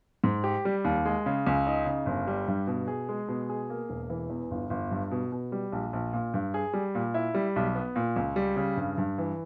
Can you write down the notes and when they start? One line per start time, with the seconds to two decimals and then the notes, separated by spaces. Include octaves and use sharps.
0.24 G#2
0.44 G4
0.65 G3
0.85 D#2
1.05 G#3
1.26 C#3
1.47 C#2
1.67 D#4
1.86 C#3
2.06 G1
2.27 G3
2.48 G2
2.67 B2
2.88 G#4
3.09 G#3
3.28 B2
3.49 G#4
3.70 A#3
3.89 E1
4.10 E3
4.30 E2
4.51 G1
4.70 G1
4.91 G2
5.11 B2
5.32 B2
5.52 G3
5.72 A#1
5.93 A#1
6.13 A#2
6.34 G2
6.54 G#4
6.73 G3
6.95 A#2
7.14 E4
7.34 G3
7.56 B1
7.75 B3
7.96 A#2
8.16 C#2
8.36 G3
8.56 C#3
8.77 G2
8.98 G2
9.18 E3